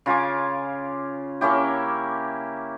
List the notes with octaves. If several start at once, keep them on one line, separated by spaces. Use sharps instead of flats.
C#3 F4 G#5 D6
A#3 C#4 E4 G4